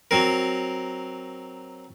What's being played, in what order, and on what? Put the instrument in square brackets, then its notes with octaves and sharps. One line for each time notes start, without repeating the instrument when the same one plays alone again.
[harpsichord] F#3 C4 A#4